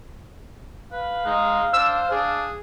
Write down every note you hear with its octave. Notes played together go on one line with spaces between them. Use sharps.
B4 F5
G#3 D#4
D4 C5 E6
D4 G#4